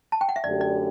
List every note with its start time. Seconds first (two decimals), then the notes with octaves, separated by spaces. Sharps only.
0.12 A5
0.21 G5
0.29 F#5
0.36 E5
0.44 F#2 D3 A3 D4 G4 D5
0.61 D5